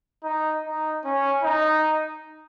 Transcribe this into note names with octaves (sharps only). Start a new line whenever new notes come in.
D#4
D#4
C#4
D#4